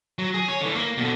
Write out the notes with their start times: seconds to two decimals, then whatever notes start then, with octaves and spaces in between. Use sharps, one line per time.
0.19 F#3
0.34 G#4
0.48 C#5
0.61 D3 E3
0.75 A#3
0.98 B2 D3